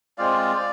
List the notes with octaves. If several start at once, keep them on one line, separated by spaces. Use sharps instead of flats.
G#3 C4 F4 D5 F5